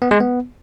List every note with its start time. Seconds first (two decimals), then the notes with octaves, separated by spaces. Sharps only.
0.02 B3
0.11 G#3
0.20 B3